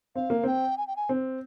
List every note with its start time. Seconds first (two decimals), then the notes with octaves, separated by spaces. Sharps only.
0.16 C4 F5
0.30 A#3
0.44 C4 G5
0.78 G#5
0.87 G5
0.96 G#5
1.09 C4